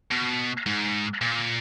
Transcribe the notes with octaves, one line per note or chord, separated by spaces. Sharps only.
B2
G#2
A#2